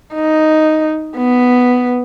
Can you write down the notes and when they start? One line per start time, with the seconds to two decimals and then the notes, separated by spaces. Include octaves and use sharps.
0.14 D#4
1.17 B3